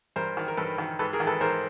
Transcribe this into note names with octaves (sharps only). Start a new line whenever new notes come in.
G2 A#4 C5
D#3
A#4
G2 A4 B4
D#3
G#2 A4 B4
G#4 A#4
D#3
A4 B4
G#2 A#4 C5